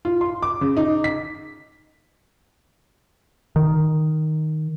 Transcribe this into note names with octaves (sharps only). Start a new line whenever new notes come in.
F4
C6
D6
C#3
D#4
B6
D#3